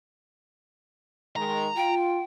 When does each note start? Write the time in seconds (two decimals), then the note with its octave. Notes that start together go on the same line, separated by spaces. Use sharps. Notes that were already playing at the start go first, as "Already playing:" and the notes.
1.36 D#3 G#3 A#5
1.76 F4 G5